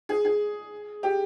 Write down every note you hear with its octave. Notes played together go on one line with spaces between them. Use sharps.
G#4
G#4
G4